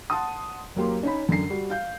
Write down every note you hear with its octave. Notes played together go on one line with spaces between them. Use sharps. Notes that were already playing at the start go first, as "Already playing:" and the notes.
F#5 A5 C6 D#6
F#1 F#3 A#3 G4 C6
C#4 D#4 B5
F#2 D3 C7
G3 F#4
F5 G6